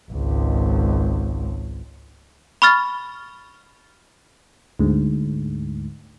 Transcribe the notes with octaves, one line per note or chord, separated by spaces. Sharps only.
G#1 C#2
B5 C#6 F6 A6
D2 G#2